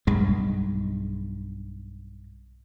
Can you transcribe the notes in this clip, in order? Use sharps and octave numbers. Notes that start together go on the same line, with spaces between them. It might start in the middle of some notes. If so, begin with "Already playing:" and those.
B1 G2 G#3